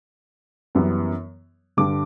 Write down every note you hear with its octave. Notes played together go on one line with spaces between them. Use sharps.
F#2 E3 G3 B3
G2 D3 G3 D6